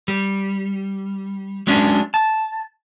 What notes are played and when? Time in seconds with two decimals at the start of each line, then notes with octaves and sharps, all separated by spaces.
0.08 G3
1.67 F#3 G#3 C#4 D4
2.14 A5